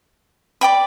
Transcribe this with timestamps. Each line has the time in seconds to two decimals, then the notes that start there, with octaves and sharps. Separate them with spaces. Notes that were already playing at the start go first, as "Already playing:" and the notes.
0.61 D5 G5 B5